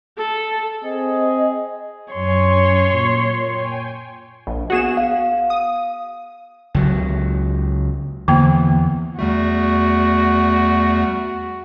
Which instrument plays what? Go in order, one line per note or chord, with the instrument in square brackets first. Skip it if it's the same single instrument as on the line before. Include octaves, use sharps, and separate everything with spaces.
[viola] A4
[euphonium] C4 [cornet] G#4 [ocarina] D#5
[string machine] F#2 G#5 C#6 [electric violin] C#5 C6
[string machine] A#2
G5 G#5
[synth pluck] A#1
[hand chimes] B3 F#5 [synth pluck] F#4 G#4 E7
[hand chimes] F5
[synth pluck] D#6
[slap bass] C#2 F#3
[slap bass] E2 [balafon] D3 A#3 G5
[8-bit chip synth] E2 G3 A3 [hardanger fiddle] F#4